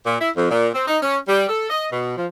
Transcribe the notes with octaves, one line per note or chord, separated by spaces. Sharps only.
A#2
E4
F2
A#2
C4
D#4
C#4
G3
A4
D#5
B2
F3